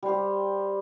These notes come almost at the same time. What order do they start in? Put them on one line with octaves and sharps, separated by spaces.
G3 C5 G4